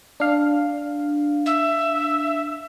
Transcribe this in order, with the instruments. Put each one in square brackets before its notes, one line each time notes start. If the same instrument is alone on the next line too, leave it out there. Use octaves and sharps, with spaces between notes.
[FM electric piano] D4 F5
[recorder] E5